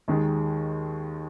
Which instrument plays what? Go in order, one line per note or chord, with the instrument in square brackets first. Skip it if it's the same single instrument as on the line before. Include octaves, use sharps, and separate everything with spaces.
[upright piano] D#2 D#3 G#3